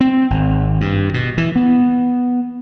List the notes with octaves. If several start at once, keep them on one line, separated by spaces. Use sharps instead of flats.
C4
G#1
G2
B2
E3
B3